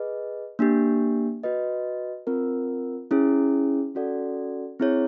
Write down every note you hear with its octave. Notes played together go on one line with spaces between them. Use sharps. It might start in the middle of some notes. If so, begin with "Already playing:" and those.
Already playing: G#4 B4 D#5
A#3 D4 G4
F#4 B4 D#5
C4 F4 A#4
C#4 E4 G#4
C#4 F#4 A4 D5 F#5
C4 E4 G#4 C#5